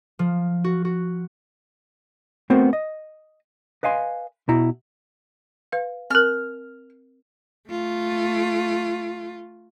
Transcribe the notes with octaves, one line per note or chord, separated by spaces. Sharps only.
F3
F#4
F#4
A3 B3 C4 F#4 A#4 C5
D#5
B4 D#5 F5 G#5 C6
B2 E4 A#5
B4 F5
C4 A#4 F6
A3 F4